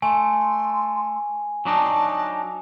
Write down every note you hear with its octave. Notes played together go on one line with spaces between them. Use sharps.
A3 G#5 C6
F#3 D4 D#4 A5